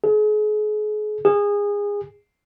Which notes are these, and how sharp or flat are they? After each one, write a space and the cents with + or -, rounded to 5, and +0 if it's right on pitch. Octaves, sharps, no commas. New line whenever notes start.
G#4 +35
G#4 -25